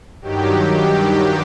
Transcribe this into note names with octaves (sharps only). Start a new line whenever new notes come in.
G2 D#3 F#3 G4